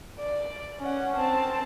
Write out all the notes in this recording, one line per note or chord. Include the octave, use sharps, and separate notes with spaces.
D5
C#4 F#5
C4 A5